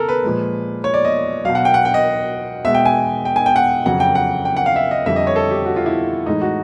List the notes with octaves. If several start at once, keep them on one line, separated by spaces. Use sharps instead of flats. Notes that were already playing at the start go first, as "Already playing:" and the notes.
Already playing: C#3 A4 A#4
B4
A#2 F3 G#3
C#5
D5
D#5
B2 F#3 F5
F#5
G5
F#5
G5
D#5
B2 G#3 E5
G5
G#5
G5
G#5
G5
F#5
F2 C#3 F#3 F#5
G5
F#5
G5
F#5
F5
E5
D#5
F2 D3 G3 E5
D#5
C#5
A4
G4
F#4
F4
E4
A2 E3 G#3 D#4
F#4